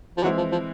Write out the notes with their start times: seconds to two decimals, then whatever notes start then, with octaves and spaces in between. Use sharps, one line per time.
0.17 F3
0.23 E3 F#3 G#3 C4 E4
0.37 F3
0.52 F3